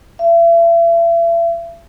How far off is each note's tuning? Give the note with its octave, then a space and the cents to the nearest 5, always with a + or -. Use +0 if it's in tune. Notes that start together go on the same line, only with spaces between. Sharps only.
E5 +40